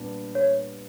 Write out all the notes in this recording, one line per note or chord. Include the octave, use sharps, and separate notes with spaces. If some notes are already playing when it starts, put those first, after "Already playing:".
Already playing: A#2 G3 B3 D4
C#5